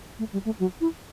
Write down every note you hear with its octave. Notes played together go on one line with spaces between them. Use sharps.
A3
G3
A3
F#3
E4